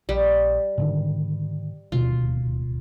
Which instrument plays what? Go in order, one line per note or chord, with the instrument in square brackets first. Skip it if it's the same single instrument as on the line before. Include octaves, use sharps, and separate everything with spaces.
[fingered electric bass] A#1 [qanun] G3
[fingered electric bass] G#2 D3 D#3
[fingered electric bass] D1 D#2 B2 [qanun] F4